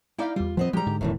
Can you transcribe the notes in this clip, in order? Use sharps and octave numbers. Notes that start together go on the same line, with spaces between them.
D#4 E4 D5 F5 G5
E2 G3 F4
F3 B3 C4 D#5
F3 G3 G#3 G4 A#5
G#2 D3
E1 F#2 A2 D#3 E3